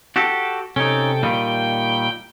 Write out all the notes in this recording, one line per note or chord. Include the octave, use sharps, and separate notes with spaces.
F#4 G4 A4
C3 C#4 D#4 A4 G5
A#2 D#3 G3 G5